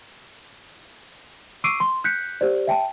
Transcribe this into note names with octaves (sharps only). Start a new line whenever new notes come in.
C#6 D6 E6 C7 D7 D#7
C6
F#6 G6 B6 C#7
G4 C5 D5
E5 G5 A5